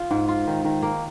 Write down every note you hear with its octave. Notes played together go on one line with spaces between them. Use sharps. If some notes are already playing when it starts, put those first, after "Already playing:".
Already playing: F4
G#2
F4
D#3
D#3
A#3